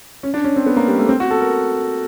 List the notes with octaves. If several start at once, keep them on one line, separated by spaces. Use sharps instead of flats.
C#4
D4
C#4
C4
B3
A#3
G3
A3
C4
F#4
A4
A#4